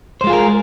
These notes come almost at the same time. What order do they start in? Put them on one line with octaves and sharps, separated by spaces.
C5 G#3 F4 G#4 A#4